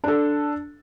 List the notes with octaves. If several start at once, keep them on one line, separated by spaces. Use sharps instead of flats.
D4 A4